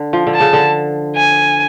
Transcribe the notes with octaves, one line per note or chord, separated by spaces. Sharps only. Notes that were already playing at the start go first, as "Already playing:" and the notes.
Already playing: D3
F3
D3
A5
C#3
D3
G#5